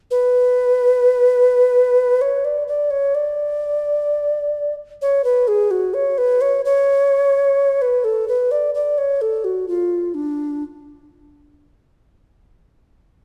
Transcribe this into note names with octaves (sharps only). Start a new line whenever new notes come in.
B4
C#5
D5
D5
C#5
D5
C#5
B4
G#4
F#4
C#5
B4
C#5
C#5
B4
A4
B4
D5
D5
C#5
A4
F#4
F4
D4